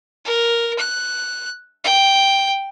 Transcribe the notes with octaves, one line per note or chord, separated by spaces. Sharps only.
A#4
F#6
G5